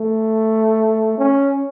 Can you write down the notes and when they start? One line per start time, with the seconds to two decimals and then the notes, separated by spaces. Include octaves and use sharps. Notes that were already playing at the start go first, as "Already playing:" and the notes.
Already playing: A3
1.18 C#4